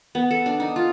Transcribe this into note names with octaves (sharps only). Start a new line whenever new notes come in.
B3
A4
D4
D#4
F4